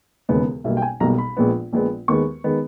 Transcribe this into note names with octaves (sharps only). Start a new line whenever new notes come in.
E1 D#2 C#3 G#3 B3
B1 B2 G3 A#3 E5
G5
G#5
B1 B2 G3 A#3 A#5
B5
A#1 A#2 G#3 B3
A#1 A#2 G#3 B3
D#2 D#3 G#3 B3 C#6
D#3 G#3 B3